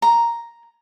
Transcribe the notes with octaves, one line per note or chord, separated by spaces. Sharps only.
A#5